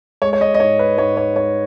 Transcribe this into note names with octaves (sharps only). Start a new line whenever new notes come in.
G#3 C#5
C#5
D#5
D#5
G#2 C#5
B4
G#2 C#5
C#5
G#3 C#5